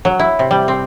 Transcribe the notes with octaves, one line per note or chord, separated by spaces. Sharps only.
F#3
E4
C3
G3
C4